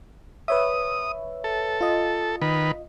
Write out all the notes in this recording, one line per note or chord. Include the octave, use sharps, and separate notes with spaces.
B4 C#5 E5 D#6
A4
F4 D#5
D#3 B4